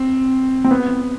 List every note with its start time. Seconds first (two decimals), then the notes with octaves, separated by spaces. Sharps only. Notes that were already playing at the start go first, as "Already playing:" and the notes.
Already playing: C4
0.64 C4
0.71 B3